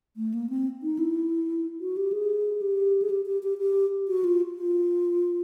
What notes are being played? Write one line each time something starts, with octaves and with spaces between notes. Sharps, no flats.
A3
A#3
C4
D#4
E4
F#4
G4
G#4
G4
G#4
G4
G4
G4
G4
F#4
F4
F4